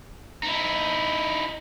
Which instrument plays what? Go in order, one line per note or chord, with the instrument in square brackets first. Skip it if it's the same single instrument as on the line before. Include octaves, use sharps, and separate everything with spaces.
[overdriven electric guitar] D#4 E4